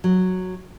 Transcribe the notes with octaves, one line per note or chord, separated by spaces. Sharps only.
F#3